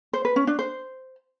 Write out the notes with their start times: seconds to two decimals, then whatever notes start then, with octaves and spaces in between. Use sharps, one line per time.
0.13 C5
0.25 B4
0.36 C#4
0.47 D4
0.59 C5